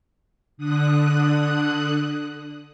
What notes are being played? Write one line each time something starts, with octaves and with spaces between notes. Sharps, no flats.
D3 D#6 F#6